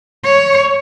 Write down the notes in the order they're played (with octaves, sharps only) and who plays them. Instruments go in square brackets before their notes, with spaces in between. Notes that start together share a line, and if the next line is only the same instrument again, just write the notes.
[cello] C#5